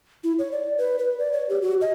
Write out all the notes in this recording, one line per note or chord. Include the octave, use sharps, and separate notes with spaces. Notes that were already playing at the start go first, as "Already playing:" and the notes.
E4
C#5
D5
B4
B4
D5
C#5
G4
F#4
D#5